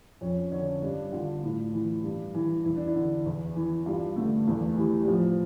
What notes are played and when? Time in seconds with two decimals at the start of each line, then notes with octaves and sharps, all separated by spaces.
0.21 F2 C#4
0.52 D3 C#4
0.82 G2 D4
1.12 D3 F4
1.43 A2
1.74 E3
2.04 G2
2.35 E3
2.65 E2 E4
2.76 D4
2.87 E4
2.96 D3
3.26 E2
3.56 E3
3.86 G2 F4
4.16 D3 A3
4.47 E2 A3
4.77 E3 G3
5.03 G3
5.08 A2 F3